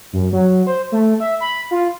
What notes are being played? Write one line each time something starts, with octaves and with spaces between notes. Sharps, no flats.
F#2
F#3
C5
A3
E5
B5
F4